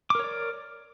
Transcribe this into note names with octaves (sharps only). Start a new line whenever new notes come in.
A#4 C#5 D5 D6